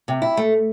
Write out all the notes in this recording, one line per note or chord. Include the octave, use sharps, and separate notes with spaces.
C3
E4
A3